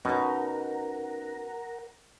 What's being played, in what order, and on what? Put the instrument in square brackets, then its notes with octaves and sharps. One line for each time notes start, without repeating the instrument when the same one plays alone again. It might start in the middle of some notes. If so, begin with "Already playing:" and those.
[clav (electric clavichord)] B2 [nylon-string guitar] C#4 D#4 [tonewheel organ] A#4 F#5 A#5